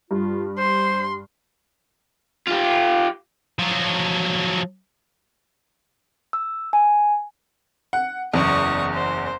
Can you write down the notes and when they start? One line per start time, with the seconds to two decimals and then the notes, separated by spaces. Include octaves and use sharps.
0.11 G2 F4
0.58 C5 C6
2.48 F4 G4
3.59 F3 F#3
6.33 E6
6.73 G#5
7.93 F#5
8.34 F#1 E2 C#6 D#6
8.93 C5